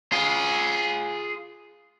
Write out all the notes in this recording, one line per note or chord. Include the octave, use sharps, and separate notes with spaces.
F4 G#4